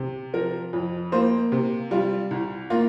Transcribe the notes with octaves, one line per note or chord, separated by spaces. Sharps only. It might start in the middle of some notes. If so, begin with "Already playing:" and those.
Already playing: C3
F3 A#4
F2
A#3 C5
C3
G3 F4
C2
A#3 F4